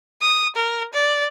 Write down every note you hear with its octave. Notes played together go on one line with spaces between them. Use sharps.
D#6
A#4
D5